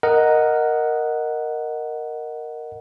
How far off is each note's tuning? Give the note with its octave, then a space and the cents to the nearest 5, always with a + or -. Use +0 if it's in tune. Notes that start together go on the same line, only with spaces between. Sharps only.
A#4 +0 D#5 +0 F#5 +0